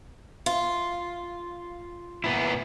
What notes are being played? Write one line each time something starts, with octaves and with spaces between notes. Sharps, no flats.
F4
A#2 B3 E4